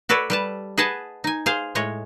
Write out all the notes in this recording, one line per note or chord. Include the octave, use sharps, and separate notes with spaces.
F#4 A4 B4 C#5 D5
G3 B4 A5
G#4 B4 D#5 F#5 G#5 A5
D#4 G#5
G#4 C5 F5
A2 G#3 C#5 D#5